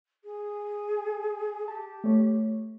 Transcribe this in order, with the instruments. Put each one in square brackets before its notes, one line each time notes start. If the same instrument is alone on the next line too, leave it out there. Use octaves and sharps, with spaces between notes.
[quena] G#4
[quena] G4 [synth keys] A5
[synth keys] A3 C#5